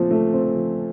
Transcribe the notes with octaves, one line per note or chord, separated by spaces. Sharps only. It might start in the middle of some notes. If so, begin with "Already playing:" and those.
Already playing: A#2 F3 A3 C4
A3
C4
F3